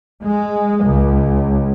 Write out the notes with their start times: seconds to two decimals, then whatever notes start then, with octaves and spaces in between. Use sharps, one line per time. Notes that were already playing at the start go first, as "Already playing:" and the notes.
0.22 G#3
0.85 C#2